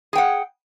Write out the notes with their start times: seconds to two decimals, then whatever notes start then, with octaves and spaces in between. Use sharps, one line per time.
0.13 G#4
0.15 G5
0.18 F#5